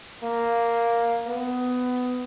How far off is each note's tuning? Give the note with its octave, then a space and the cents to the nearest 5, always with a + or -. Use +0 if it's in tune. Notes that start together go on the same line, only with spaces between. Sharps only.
A#3 +0
B3 +20